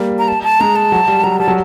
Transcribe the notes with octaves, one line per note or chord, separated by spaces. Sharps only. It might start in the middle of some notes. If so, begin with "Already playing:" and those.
Already playing: G3 A#3
A#5
A5
A5
G#3 A#5
A5
F#3
G3
F#3 A#5
G3 A5
F#3